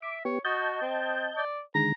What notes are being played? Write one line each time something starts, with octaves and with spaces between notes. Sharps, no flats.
E5 D6
B3 G4 C#5
F#4 D#5 A5 G6
C4
D5
D3 D#3 G#3 A#5